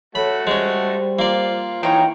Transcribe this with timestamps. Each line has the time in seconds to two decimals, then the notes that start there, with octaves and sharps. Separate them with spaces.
0.15 A3 F#4 A4 C#5 B5
0.47 G3 G#3 C#4 C5
1.19 A#3 F4 D5
1.83 E3 D#4 F4 C#5 G5 A#5 C#6